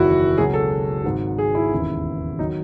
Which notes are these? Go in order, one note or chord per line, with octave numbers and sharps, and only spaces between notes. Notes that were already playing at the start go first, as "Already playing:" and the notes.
Already playing: F#1 E2 D#3 F#3 E4 F#4
C#2 B2 F#3 G#4
A4
G#1 G#2 F#3
G#4
E4
E1 D#2 C#3 E3
D#3 F#3 D#4